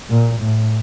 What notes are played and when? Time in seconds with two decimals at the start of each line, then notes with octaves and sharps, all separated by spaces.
0.10 A#2
0.40 A2